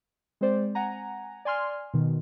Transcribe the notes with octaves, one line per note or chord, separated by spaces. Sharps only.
G#3 C4 C5 D5
F#5 G#5 A#5
D5 G#5 C6 F6
B2 D#3